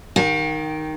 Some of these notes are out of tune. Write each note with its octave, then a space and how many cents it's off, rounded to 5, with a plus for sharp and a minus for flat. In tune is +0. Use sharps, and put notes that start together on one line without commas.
D#3 +0 G4 +0 F5 +45